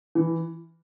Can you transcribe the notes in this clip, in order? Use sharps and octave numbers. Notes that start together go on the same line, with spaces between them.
E3